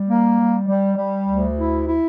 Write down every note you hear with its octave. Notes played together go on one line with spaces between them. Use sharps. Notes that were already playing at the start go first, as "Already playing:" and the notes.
Already playing: G3
A#3
G3
G3
G3
D2
E4
E4